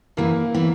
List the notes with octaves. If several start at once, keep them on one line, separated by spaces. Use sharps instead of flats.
F#2 E3 A#3 B3
E3 B3